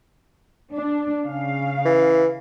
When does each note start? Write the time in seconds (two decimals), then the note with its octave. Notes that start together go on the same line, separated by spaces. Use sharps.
0.74 D4
1.25 C#3 F5
1.85 E3